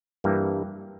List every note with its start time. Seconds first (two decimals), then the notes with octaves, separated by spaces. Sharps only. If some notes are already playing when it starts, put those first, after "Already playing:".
0.24 G2 E3 G3 A#3